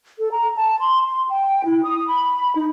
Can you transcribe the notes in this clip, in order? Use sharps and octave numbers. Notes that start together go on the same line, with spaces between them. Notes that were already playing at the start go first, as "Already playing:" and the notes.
A4
A#5
A5
C6
C6
G5
E4
D#6
B5
D#4